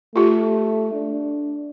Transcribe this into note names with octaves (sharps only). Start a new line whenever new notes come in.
A3 F4 G4
D4